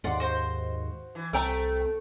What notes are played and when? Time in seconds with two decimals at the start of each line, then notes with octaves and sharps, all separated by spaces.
0.04 D#2 G#2 D5 F#5 C6
0.20 F#4 C5
1.15 E3
1.33 C2 A3 C4 G5 A#5 E6